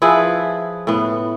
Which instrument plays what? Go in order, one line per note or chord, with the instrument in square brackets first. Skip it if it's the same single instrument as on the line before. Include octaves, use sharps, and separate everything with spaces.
[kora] F3 E4 G#4 B4
A2 B3